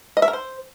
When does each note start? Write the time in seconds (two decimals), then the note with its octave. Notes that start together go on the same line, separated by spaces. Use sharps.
0.17 D#5
0.22 E5
0.28 A#4
0.33 C5